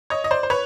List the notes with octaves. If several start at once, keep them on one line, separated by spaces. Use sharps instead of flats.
C#5 D#5
D#5
C5 D5
C5
B4 C#5